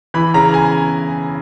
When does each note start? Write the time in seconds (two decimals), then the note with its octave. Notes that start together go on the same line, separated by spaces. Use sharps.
0.14 E3 B5
0.34 C#3 A#5
0.54 G#5